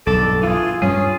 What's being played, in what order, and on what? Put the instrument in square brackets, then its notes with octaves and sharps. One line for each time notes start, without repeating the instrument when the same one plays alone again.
[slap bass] B1 G2 [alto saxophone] A4 [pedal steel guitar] D5
[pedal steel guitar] E3 G#4 [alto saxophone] F4
[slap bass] G2 G3 [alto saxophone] C#4 [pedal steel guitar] F4 G#4